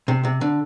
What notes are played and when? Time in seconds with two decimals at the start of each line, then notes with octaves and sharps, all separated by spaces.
0.08 C3
0.25 C3
0.41 D3